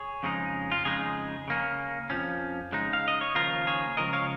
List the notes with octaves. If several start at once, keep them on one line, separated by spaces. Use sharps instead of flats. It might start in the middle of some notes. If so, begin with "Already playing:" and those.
Already playing: G#4 C#5
F2 C#3 G#3 D#4
F4
F2 C#3 G#3 D#4 G#4
C#3 A#3 C#4
F2 F3 C#4
C#3 G#3 D#4
F5
D#5
C#5
D#2 C#3 F3 A#3 F4 A#4
G#4 C#5
C#2 C#3 F3 A#4 D#5
C#5 F5